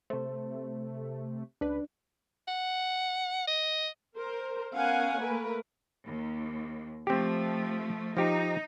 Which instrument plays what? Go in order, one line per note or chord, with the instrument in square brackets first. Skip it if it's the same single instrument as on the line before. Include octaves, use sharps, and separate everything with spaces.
[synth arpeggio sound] C3 A3 [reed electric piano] C5
[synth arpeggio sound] C#2 B4 [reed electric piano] D4
[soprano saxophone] F#5
D#5
[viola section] A#4 C5
B3 C#4 A#4 F5 F#5 G#5
A3 A#3 A#4 B4
[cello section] D#2
[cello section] F3 A3 [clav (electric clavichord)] C4 G4
[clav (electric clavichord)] F3 G4 [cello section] D#4